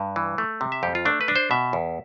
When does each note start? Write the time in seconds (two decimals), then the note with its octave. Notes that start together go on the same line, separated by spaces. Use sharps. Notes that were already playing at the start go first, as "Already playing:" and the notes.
Already playing: G2
0.16 E3
0.38 A3
0.61 C3
0.72 E5
0.83 F2 G4
0.95 F4
1.05 A3 D4
1.21 B4
1.28 D4
1.36 C5
1.51 B2 E5
1.73 E2